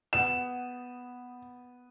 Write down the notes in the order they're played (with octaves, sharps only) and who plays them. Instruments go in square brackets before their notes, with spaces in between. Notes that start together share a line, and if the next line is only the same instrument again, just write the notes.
[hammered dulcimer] B3 [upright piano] E7